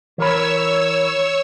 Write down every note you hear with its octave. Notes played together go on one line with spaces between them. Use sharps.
E3 A#4 C#5 B5 E6